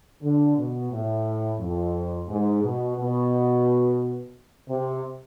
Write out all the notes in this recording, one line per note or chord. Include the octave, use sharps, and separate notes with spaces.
D3
B2
A2
F2
G#2
B2
B2
C3